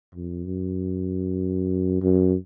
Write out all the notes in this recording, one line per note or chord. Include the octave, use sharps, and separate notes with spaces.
F2
F#2
F#2